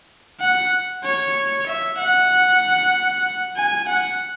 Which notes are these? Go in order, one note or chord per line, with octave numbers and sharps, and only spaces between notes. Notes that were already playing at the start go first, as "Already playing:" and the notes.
F#5
C#5
E5
F#5
G#5
F#5